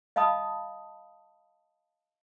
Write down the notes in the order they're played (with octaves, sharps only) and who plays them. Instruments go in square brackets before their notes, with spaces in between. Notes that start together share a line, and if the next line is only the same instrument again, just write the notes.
[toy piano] D#5 F5 A5 B5 D#6